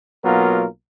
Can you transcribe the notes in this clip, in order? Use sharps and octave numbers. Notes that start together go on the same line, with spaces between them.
B1 F#3 A#3 B3 F4 A#4